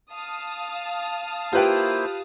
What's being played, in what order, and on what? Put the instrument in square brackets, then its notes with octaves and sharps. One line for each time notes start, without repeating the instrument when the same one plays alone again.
[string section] F5 A5 D#6
[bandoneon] A#3 E4 C5 [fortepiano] F4 B4 G5 [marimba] G4